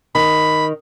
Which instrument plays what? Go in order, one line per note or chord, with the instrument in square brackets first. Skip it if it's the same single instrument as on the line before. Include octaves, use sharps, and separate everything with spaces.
[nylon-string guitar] D#3 [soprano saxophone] B5